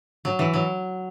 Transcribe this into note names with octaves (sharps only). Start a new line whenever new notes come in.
F#3
E3
F#3